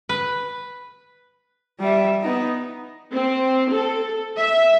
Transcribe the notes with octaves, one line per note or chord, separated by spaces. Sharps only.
B4
G3 E5
B3 D#4
C4
A4
E5